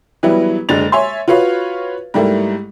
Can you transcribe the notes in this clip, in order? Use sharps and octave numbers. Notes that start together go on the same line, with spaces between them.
E3 F#3 G3 B3 E4
F#1 D3 G#3 A6 F7
C#5 E5 G#5 C6
F4 F#4 B4 C#5 F5
G#2 G3 A3 A#3 E4